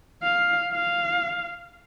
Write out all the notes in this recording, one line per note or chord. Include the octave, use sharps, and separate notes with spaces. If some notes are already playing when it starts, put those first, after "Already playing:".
F5
F5